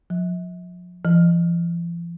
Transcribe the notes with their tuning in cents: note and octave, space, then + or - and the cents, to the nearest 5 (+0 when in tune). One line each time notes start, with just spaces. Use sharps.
F3 +35
F3 -45